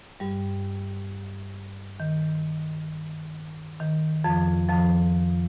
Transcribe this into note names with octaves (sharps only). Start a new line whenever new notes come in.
G2 G3
D#3
D#3
F2 F3
F2 F3